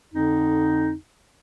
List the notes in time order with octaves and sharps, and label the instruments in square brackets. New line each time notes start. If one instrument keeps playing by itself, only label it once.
[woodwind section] F2 D3 D#4